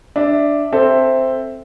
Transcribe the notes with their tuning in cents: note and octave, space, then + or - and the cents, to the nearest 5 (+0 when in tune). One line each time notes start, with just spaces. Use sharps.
D4 +0 E5 +0
C4 +0 A4 +0 E5 +0